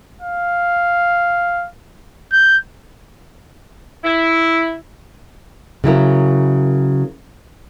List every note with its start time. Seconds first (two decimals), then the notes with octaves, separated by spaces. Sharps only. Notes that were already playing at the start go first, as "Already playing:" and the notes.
0.21 F5
2.32 G6
4.04 E4
5.84 C#3 F#3 E4 A#4